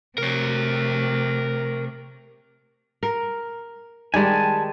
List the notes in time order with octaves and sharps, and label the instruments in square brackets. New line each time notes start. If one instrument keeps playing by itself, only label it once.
[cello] C3 A3 [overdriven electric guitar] A#4 C#5
[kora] A#4
[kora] D#3 G3 G#3 [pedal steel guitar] G#5 A5